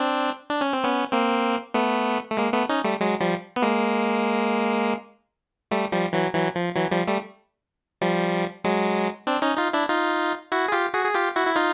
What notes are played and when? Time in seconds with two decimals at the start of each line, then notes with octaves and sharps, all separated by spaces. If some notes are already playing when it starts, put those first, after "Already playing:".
Already playing: C4 D4
0.50 D4
0.61 C#4
0.73 C4
0.84 B3 C#4
1.12 A#3 C4
1.74 A3 B3
2.32 A3
2.37 G#3 A#3
2.53 A3 B3
2.69 C#4 D#4
2.84 G3 A3
3.01 F#3 G#3
3.21 F3 G3
3.56 B3
3.62 G#3 A#3
5.71 G3 A3
5.92 F3 G3
6.13 E3 F#3
6.34 E3 F#3
6.56 F3
6.75 E3 F#3
6.91 F3 G3
7.07 G3 A3
8.01 F3 G3
8.64 F#3 G#3
9.27 C4 D4
9.42 C#4 D#4
9.57 D#4 F4
9.73 D4 E4
9.89 D#4 F4
10.52 E4 F#4
10.68 G#4
10.72 F4 G4
10.94 F#4 G#4
11.05 G#4
11.14 F4 G4
11.36 E4 F#4
11.47 E4
11.56 D#4 F4